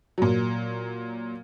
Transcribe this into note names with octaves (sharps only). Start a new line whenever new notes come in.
A#2 F#3